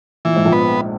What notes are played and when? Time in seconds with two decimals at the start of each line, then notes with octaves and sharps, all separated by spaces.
0.25 A#2 E3
0.36 G#2
0.45 A#1 A#2
0.52 B3